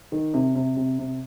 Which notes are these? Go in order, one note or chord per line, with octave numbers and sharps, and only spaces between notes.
D#3
C3
C3
C3
C3